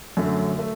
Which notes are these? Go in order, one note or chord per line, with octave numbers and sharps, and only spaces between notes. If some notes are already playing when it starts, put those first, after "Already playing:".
F#2 D3 F#3 A3
A3